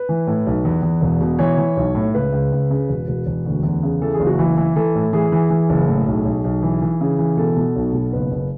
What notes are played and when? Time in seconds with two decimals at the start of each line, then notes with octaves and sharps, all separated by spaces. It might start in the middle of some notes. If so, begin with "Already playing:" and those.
Already playing: B4
0.09 E3
0.27 A2
0.46 B1
0.65 E2
0.83 E2
1.01 E1
1.21 B2
1.39 E3 C#5
1.58 E3
1.77 B1
1.95 A2
2.14 C#2 B4
2.33 C#2
2.52 C#2
2.71 C#3
2.89 E1
3.08 E1
3.26 E1
3.45 D2
3.63 E2
3.83 C#3
4.01 E3 A4
4.14 G#4
4.19 F#1
4.27 F#4
4.39 E3 E4
4.57 E3
4.76 E3 A4
4.95 A2
5.13 E3 G#4
5.32 E3
5.50 E3
5.69 F#1
5.88 A2
6.06 B1
6.25 B1
6.44 B1
6.63 E3
6.82 E3
7.01 C#3
7.19 E3
7.37 B2 A4
7.56 B2
7.76 B1
7.93 B2
8.13 F#1 B4
8.30 F#1